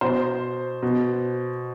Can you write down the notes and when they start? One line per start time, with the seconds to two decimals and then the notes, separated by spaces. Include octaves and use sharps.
0.01 B2 C5
0.82 B2